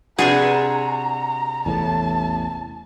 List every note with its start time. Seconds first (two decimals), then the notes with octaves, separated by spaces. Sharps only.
0.19 C3 D4 F#4 G#4 B4
0.52 A#5
1.66 A1 E2 A2 A5